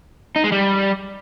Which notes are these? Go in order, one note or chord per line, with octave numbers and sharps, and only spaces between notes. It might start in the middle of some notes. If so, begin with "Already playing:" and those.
D#4
G#3
G3